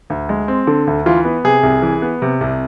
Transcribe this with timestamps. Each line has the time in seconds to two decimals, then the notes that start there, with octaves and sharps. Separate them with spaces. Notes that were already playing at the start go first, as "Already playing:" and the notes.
0.10 D2
0.29 G#3
0.48 C4
0.67 D3
0.87 D2
1.06 E3 F4
1.25 B3
1.44 C3 G#4
1.63 C2
1.82 E3
2.02 B3
2.22 C3
2.41 C2